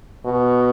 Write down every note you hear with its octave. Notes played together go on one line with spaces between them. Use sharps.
B2